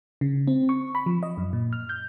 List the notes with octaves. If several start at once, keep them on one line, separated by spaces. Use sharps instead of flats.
C#3
C4
C#6
B5
F3
D#5
F#2
A#2
F6
G6